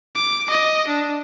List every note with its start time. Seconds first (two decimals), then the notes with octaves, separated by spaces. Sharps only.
0.15 D6
0.50 D#5
0.88 D4